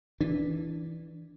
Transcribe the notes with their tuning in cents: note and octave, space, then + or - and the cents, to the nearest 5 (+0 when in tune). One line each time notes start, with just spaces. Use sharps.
E3 -10 D4 +0